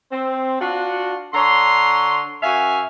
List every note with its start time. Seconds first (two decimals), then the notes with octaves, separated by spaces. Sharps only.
0.12 C4
0.60 D4 F4 F#4
1.33 D3 C#5 A#5 C6
2.43 F#2 F#4 E5 F5 G#5